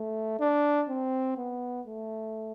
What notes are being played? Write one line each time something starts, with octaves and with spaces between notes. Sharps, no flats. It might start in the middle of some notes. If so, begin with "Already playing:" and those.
Already playing: A3
D4
C4
B3
A3